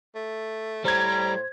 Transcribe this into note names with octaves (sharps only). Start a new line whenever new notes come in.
A3
A2 G3 C5 A#5 G#6